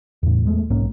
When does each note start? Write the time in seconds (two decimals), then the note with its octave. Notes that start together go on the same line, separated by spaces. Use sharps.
0.23 E2 A2
0.45 E2 G#3 A3
0.70 B1 G#2 A#3 C#4